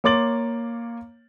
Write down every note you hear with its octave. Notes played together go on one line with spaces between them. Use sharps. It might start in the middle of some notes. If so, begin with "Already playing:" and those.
A#3 C#5 C6 D6 A6 F#7